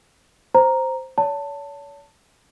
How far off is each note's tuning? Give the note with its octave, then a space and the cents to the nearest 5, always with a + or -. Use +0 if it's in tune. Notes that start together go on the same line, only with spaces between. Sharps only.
C5 +0 A#5 +0
C#5 +40 A5 +15